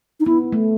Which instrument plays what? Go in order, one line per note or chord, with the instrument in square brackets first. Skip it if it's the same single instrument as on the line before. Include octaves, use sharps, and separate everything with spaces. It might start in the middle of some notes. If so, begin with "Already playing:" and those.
[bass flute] D#4
[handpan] B3 [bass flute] E4
[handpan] A3